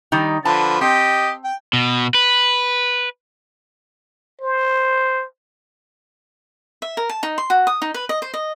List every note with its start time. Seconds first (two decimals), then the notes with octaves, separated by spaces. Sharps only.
0.12 D#3 G3 D#4
0.45 D3 F3 B4 A5
0.81 C4 G4 D#5
1.44 G5
1.73 B2
2.14 B4
4.41 C5
6.82 E5
6.97 A#4
7.10 A5
7.23 D#4
7.38 C6
7.50 F#4
7.67 D#6
7.82 D#4
7.94 B4
8.09 D#5
8.22 C5
8.34 D#5